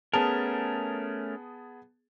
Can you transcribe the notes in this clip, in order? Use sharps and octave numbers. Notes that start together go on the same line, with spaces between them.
A3 B3 C#4 G#4 A#4 A5